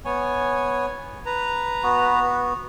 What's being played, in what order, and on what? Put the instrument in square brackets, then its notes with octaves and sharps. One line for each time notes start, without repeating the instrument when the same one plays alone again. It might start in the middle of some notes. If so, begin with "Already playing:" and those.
[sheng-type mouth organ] B3 C#5 G#5
B4 A#5
[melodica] B3 F#4